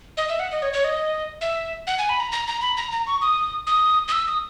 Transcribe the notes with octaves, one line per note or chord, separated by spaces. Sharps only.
D#5
E5
F#5
D#5
C#5
C#5
D#5
E5
F#5
G#5
B5
A#5
A#5
A#5
B5
A#5
A#5
C#6
D#6
D#6
D#6
E6
D#6